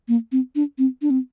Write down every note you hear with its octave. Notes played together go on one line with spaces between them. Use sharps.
A#3
C4
D4
C4
D4
C4